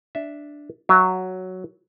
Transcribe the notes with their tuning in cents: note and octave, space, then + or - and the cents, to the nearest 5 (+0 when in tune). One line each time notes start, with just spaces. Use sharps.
D4 +0 E5 +0
F#3 +0 E5 +35